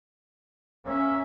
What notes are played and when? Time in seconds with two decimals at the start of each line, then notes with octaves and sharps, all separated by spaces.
0.85 A#3 C#4 E5